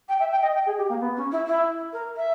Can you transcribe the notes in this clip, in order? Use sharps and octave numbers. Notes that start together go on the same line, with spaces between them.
G5
E5
G5
D#5
G5
G#4
G4
A#3
B3
C#4
E4
E4
A#4
E5